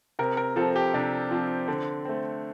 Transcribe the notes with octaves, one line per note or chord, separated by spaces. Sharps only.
C3 A#4
A#4
F3 C4 A4
G4
C3 D4
F3 C4
D3 C4
A3 C4